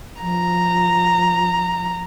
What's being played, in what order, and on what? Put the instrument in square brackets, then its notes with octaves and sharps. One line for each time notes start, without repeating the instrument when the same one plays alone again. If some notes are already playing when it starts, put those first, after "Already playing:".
[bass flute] F3 [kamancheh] A#5